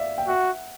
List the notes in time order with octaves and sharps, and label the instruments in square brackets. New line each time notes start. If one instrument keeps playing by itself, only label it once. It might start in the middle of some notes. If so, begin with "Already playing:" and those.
Already playing: [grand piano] D5 E5 F5
G5
[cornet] F#4 [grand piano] E5 F#5